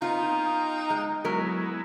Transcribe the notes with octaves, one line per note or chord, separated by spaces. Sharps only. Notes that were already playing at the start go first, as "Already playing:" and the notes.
B3 C4 D#4 F4
F5 G5 D#6
G#3
F#3 G#3 B3 E4 A#4